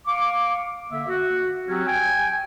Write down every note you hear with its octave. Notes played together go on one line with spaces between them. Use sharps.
F5 C#6 D6
D3 A#3 E5
F#4
F#3 C4 C#4 F#4 G4
G5 G#5